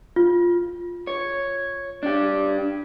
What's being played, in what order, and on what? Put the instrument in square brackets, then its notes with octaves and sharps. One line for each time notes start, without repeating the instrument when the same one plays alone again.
[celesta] F4
[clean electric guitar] C#5
D4 G4